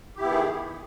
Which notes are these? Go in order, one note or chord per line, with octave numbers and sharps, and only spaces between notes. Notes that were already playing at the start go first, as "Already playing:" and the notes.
D#3 B3 E4 G4 G#4